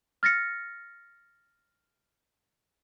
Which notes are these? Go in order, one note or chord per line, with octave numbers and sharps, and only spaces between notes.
F6 A6 A#6 C#7